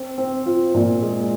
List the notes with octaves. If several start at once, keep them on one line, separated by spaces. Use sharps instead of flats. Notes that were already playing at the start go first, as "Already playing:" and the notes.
Already playing: C4
C4
F4
A#2
G#3